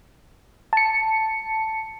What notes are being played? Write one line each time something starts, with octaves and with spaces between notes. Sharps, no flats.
A5 C#7